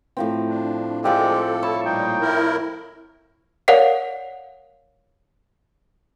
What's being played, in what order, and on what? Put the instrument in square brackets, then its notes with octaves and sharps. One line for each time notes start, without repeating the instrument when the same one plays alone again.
[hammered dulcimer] A2 F3 C4
[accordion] D4
[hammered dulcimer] F3 D5 E5 [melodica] G#3 C4 G4 [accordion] A4
[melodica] E4 A5 [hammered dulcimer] C#5
[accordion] A#2 G3 A#3 [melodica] D#4 G5
[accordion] E4 A#4
[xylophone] A#4 C#5 D5 F5 F#5 C7